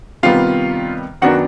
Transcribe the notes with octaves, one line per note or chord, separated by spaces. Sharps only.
C3 D#3 G3 B3 F4 F5
F#2 D#3 F#3 B3 D4 F#4 F#5